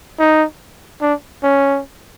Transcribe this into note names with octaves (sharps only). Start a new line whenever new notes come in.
D#4
D4
C#4